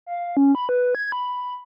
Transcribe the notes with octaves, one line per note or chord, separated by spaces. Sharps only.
F5
C#4
B5
B4
G#6
B5